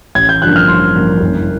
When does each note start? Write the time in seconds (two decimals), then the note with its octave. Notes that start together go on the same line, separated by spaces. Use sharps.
0.15 A1 G#6
0.29 G6
0.42 G2 D3 F3 A#3 F#6
0.56 F6
0.68 A1 C6
0.94 G2 D3 F3 A#3
1.21 F#1